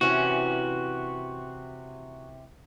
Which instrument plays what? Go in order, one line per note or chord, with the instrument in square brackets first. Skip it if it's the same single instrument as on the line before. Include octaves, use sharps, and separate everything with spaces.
[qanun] C3 E3 C#4 [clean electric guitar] F#4